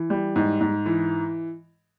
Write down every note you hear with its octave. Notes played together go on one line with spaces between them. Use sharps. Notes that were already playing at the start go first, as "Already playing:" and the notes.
Already playing: E3
G3
G#2
G#2
E3